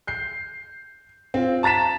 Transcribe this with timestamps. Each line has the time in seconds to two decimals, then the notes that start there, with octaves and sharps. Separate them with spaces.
0.07 G6 C7
1.34 C4 F4
1.63 A5 A#5 A6 B6 E7